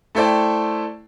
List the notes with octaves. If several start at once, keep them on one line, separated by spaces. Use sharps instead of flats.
A3 E4 A4 C5 D5 G5